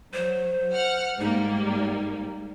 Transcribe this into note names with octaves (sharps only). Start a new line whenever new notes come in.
F#3 C5
F#5 F6
G#2 G3 A#3 D#4